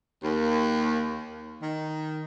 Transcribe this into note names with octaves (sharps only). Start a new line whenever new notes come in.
D#2
D#3